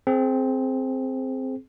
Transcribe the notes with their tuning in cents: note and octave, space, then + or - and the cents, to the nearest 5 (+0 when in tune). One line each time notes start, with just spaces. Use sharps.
C4 +0 G#4 +35